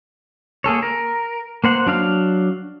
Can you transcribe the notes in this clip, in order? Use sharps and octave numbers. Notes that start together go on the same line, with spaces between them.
A#3 G#4 A4 C#5
A#4
A#3 C5 F#5
F#3 D4 F5 F6